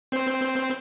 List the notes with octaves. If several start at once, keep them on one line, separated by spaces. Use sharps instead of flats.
C4 C5